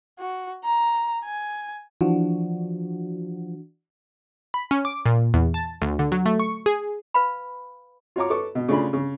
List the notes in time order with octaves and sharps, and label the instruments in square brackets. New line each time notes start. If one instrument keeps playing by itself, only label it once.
[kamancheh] F#4
A#5
G#5
[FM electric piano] E3 D4 F#4 [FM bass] F3
[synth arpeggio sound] B5
C#4
D6
A#2
E2
A5
D2
D3
F#3
A3
C#6
G#4
[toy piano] B4 F5 B5
[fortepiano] F4 F#4 C#5 A#5 D6
A4 B4 C#6 D6
B2
C#3 A3 D4 F4 G#4 B5
C#3